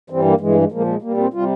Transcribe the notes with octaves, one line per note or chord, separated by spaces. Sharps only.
G2 E3 G3 C4
A#3
G2 E3 G#3
G#3
A#2 F3 G#3 A#3
G#3
A#2 G3 A#3
C4
C3 G3 F4